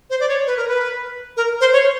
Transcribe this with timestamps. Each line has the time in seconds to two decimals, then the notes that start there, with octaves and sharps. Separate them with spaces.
0.10 C5
0.20 D5
0.29 C#5
0.47 B4
0.57 A#4
0.68 B4
1.37 A#4
1.61 C5
1.73 C#5